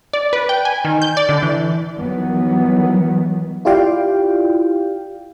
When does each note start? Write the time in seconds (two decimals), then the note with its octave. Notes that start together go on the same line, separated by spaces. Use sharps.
0.13 D5
0.33 B4
0.49 G5
0.65 G#5
0.85 D#3
1.02 G6
1.17 D5
1.29 D3
1.43 E3
1.95 D#3 E3 F#3 G3 B3
3.65 E4 F4 G4 D5 F5 G5